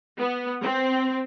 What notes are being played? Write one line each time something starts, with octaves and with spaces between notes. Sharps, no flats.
B3
C4